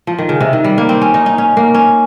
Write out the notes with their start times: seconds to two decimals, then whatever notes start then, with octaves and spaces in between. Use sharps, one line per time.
0.07 F3
0.19 D#3
0.29 C#3
0.41 C3
0.53 D#3
0.64 G3
0.78 A#3
0.89 C4
1.01 C#4
1.14 D#4
1.26 D#4
1.38 C#4
1.57 A#3
1.74 C#4